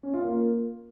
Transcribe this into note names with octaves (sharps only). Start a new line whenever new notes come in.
C#4
F4
A#3